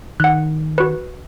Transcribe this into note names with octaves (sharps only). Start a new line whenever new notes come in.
D#3 F#5 F#6
F#4 B4